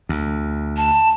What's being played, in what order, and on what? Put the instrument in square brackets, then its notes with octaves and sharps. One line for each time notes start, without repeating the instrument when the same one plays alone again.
[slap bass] D2
[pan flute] A5